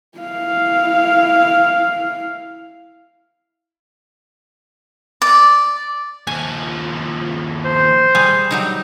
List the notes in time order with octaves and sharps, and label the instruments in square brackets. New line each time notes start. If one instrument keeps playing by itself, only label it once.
[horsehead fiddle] E4 F5
[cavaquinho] D5
[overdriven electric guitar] D#2 F3 [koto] G#5
[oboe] C5
[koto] G3 G#4
F#3 G3 D#4